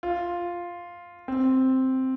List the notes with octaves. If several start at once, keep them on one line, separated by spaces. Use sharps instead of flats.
F4
C4